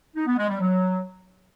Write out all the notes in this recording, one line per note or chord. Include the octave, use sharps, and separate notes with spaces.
D#4
B3
G#3
G3
F#3